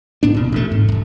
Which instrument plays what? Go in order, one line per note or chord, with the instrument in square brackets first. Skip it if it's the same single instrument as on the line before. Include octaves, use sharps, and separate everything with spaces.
[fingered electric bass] A2 B3 D4
D1 B2
A1 A3
G#2
D1 F2